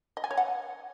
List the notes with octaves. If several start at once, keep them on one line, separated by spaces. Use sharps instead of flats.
D#5
G#5
C#5
F#5